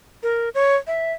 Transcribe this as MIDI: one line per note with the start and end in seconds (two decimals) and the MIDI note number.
0.23 0.49 70
0.55 0.76 73
0.87 1.13 76